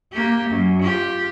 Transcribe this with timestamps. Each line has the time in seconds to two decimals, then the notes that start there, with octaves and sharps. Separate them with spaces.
0.13 A#3 G4
0.50 F#2
0.83 F4 G4